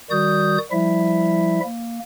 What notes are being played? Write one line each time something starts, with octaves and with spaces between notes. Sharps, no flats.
D#3 G3 F#4 D5 D#6 G6
F3 G3 E4 E5
A#3